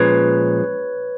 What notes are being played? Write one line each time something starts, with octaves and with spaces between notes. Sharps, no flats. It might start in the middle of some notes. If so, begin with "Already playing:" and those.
Already playing: A#2 F3 G#3 C#4 B4 C#5